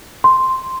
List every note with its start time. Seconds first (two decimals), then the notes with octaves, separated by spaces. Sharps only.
0.24 C6